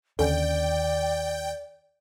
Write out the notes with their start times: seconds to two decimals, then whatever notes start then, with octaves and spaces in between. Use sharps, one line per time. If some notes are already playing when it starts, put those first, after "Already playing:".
0.19 D#2 D3 D#3 C#4 D5 G5